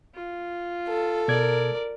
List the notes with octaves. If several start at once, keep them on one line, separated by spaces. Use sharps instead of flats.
F4
A4
B2 A#4 D5 G#6